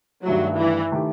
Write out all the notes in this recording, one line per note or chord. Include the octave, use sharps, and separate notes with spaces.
G2 D#3 F#3 A3 E4 G4
E3
D#3 A3 E4 G4